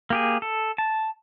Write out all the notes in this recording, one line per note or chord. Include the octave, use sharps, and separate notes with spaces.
A#3 G4 G#4
A4
A5